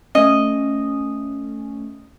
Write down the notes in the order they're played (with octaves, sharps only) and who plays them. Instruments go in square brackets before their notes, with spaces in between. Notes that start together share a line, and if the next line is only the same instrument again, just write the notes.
[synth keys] A3 C#4 [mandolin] D#5